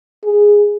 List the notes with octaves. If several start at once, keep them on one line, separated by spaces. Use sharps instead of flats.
G#4